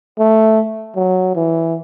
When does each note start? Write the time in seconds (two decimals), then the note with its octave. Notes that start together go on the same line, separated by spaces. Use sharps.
0.18 A3
0.96 F#3
1.35 E3